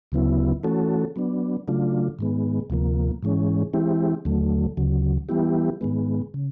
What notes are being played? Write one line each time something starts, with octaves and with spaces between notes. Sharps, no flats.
D2 C#3 F#3 B3 E4
E3 A3 C#4 F#4 A4
F#3 B3 D4
C#3 F#3 A3 D4 F4
G#2 D#3 G#3 B3
D2 C3 F3 A#3
G#2 E3 G#3 C#4
E3 G#3 C4 E4 G4
D#2 D3 F#3 A3
D2 C#3 F#3
E3 G3 B3 E4 G4
G#2 D#3 G#3 B3
C#3